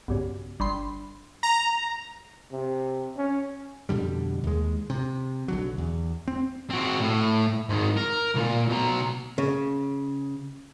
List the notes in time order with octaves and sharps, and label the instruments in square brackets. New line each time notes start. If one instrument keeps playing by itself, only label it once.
[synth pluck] B1 G2 C#3
G1 B5 C6
[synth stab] A#5
[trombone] C3
C#4
[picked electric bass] F2 B2 D3 G3
D#2 G#3
C3
B1 D3 F#3
E2
C4
[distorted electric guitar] C4 F#4
A2
G#2 D#3
A#4
C2 A#2
B2 A#5
[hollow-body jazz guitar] C#3